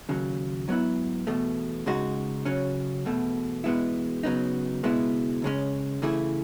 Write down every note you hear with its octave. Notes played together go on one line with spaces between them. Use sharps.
D#2 C#3 F#3
G#2 F#3 B3 E4
E2 B2 A3
C#2 C#3 G#3 D#4 F#4
C#3 F#3 C#4
E2 B2 A3
E2 B2 G#3 B3 E4
C#3 F#3 B3 D#4
C#2 B2 G#3 B3 E4
C#2 C#3 G#3 C#4
C#3 E3 A3 E4 G#4